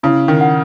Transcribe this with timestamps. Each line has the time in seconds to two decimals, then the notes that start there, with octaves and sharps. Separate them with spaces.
0.03 C#3 E4
0.28 D#3
0.41 F#5